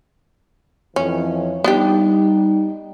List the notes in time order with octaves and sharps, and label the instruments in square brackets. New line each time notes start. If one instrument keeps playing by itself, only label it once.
[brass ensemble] F2 E3 [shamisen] C#4
[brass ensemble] G3 D#4 [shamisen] B3 D4 G4